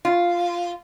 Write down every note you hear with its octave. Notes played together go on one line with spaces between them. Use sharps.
F4